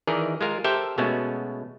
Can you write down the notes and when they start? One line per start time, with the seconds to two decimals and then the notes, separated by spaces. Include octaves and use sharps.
0.07 D#3 E3 G#4 A#4 D5 D#5
0.41 G#3 F4 A#4
0.64 G4 A4 A#4 C5 E5 G5
0.98 B2 G#3 A3 B3 C#4 F#4